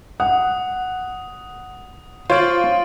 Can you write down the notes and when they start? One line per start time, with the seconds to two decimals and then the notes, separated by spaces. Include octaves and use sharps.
0.20 F#5 D#6
2.30 F4 C5 C#5 F5 C#6 D7 F#7